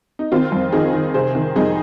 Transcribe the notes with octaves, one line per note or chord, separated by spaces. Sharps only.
D#4
D#3 C4 F4
F2
D#3 D#4 G#4
D#3
C3 G#4 C5
D#3
F2 D#4 G#4